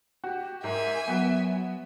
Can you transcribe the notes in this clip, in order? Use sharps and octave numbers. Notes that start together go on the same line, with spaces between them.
F#4 G4
G#2 A#4 E5 G#5
F#3 B3 F#4